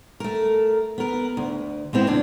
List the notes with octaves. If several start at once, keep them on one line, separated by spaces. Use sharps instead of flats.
A3 A#4
B3 A#4
D2
G#3 B3 C4 E4
E2 C#3 D4